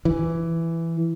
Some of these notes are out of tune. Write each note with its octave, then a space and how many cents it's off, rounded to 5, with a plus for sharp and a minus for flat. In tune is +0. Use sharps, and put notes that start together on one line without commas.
E3 +10